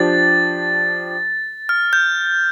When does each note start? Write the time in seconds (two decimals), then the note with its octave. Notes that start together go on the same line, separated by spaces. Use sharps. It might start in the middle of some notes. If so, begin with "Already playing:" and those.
Already playing: F3 D4 G4 A6
1.69 F6
1.93 G6